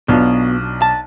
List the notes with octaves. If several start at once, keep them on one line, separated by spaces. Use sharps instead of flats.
B1 B2 D4 F4
A5